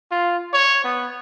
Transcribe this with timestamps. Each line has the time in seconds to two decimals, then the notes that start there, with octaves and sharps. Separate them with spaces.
0.11 F4
0.53 C#5
0.84 B3